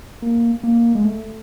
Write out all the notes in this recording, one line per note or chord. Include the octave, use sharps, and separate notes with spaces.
A#3
A#3
G#3
A3